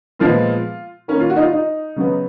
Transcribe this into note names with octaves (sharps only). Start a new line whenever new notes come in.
A#2 F3 G#3 B3 F4
D#3 A#3 C#4
F4
F#4
D#4
F4
D#4
C#3 F#3 B3